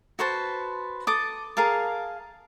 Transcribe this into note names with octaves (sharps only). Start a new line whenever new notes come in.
F#4 B4 C5 A5
A4 A5 D6 D#6
G#4 A#4 F5 A5